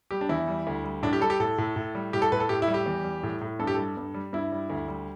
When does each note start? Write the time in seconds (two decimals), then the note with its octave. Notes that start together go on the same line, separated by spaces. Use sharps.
0.11 G3 G4
0.21 D4
0.29 E2 E4
0.48 G3
0.67 D2
0.84 G3
1.02 A2 D4
1.13 G4
1.21 G3 A4
1.30 G4
1.40 A2 A4
1.58 A2
1.76 A2
1.95 G3
2.13 A2 G4
2.22 A4
2.32 A2 B4
2.40 A4
2.49 A2 G4
2.62 E4
2.68 G3
2.74 G4
2.86 E2
3.04 G3
3.23 A2
3.41 A2
3.59 G2 A4
3.67 G4
3.74 G3 A4
3.97 G2
4.14 G3
4.33 G2 E4
4.52 G3
4.70 D2
4.88 G3